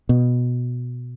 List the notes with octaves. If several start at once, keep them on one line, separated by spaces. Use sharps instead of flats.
B2